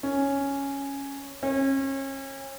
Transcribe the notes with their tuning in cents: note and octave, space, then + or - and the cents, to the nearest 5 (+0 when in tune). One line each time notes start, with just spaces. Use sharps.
C#4 +0
C#4 -35